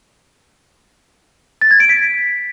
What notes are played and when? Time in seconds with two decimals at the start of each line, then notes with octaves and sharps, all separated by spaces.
1.61 A6
1.71 G#6
1.80 D7
1.89 B6